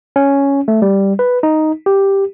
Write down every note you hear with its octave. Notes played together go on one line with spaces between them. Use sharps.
C#4
A3
G3
B4
D#4
G4